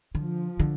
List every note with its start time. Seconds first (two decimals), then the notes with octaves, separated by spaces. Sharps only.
0.15 D3 F3
0.60 D3